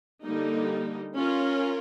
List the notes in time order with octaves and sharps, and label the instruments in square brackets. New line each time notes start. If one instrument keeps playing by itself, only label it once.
[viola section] D3 G3 A#3 D#4
C#4 F4 A#4